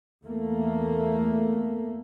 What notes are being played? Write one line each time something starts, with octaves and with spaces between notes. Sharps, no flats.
E2 A3 A#3